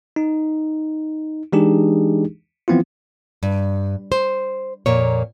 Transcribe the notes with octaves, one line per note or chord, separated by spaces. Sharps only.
D#4
E3 G#3 D4 D#4 G4 G#4
E3 F3 B3 C4 E4 F4
G2
C5
F2 A#2 A#3 C#5